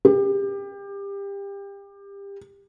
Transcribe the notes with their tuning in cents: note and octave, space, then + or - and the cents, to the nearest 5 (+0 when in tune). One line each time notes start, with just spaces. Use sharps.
G4 +25